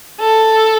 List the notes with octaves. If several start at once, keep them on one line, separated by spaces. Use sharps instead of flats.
A4